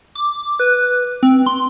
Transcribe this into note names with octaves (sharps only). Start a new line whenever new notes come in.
D6
B4
C4
C6